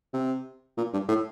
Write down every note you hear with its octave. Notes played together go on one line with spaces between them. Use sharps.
C3
A#2
G2
A2